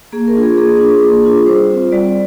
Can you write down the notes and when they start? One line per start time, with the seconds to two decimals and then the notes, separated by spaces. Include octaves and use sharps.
0.13 A#3 G#4
0.28 A#4
0.36 D4 F4
0.43 G#4
0.57 A#3 G#4
0.80 D4 F4
1.03 A#3
1.24 D4 F4
1.47 G3 C5
1.70 C4 F4
1.92 G3 D5